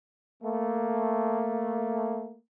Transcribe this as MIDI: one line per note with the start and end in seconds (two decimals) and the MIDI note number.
0.42 2.38 57
0.42 2.38 58